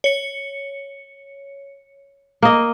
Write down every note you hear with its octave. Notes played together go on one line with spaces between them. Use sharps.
C#5 C#7
A#3 D#5